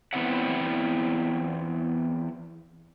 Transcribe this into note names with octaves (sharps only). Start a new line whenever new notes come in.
E2 B3 C4 E4 E5 F#5